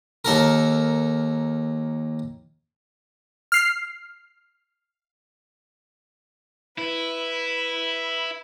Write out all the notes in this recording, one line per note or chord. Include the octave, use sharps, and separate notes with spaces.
D#2 A4 A#4
F6 C7
E4 B4